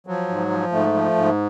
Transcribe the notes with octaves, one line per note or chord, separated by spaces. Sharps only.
F3 F#3
G#2
F3
G#2 A3
F3
G#2